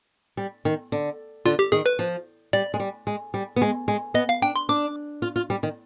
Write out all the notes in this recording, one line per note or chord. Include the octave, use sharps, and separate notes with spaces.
G3
D#3
D3
D3 F4
G4
D#3 G#4
B4
F3
G3 D5
G#3
G3
G#3
G3
B3
G#3
G#3
B3 D#5
F5
D4 G5
C6
D4 D6
F4
F4
G3
D#3